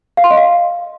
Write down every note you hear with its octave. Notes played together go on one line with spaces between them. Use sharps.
F5
C6
D#5
F5